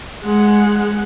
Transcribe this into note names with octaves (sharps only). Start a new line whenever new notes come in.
G#3 F#5